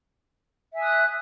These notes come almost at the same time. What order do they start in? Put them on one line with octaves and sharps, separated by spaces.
E5 G#5 D#6 F#6